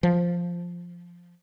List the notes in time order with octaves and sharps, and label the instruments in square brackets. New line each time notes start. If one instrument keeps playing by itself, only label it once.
[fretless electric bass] F3